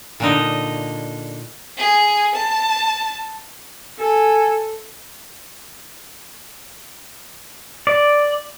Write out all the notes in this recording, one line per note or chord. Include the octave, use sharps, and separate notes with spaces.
A#2 D3 D#4
G#4
A5
A4 G#5
D5